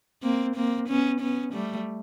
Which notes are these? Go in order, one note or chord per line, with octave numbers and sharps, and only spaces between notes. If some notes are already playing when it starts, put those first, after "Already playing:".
A#3 C4
A#3 C4
B3 C#4
B3 C#4
G3 A3